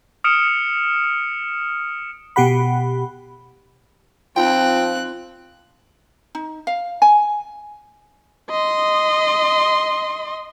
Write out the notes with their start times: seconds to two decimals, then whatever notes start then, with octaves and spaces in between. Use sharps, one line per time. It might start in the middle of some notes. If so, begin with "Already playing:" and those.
0.24 D#6 F6 C#7 D7 E7
2.36 B2 G4 F#5 B5
4.36 F3 C4 D#4 F4 G5 C6 F#6
6.35 D#4
6.67 F5
7.02 G#5
8.50 D#5 C6